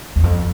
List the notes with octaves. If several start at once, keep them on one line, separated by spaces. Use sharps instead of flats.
E2
F2